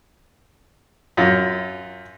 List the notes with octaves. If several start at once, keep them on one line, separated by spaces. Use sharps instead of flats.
F#2 F4